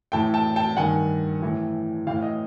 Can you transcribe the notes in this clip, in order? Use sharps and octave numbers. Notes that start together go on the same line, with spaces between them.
A2 E3 G5 A5
G5 A5
G5 A5
G2 D#3 F#5 G#5
A2 E3
A2 E3 F5 G5
D#5 F5